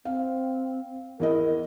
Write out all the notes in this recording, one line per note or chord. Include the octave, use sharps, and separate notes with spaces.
C4 F5
E2 E4 A#4 D#5